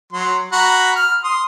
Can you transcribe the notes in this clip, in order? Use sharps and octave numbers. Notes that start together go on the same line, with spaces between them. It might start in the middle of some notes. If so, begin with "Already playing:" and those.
F#3 C6
F#4 A#5 B5
F6
C6 D#6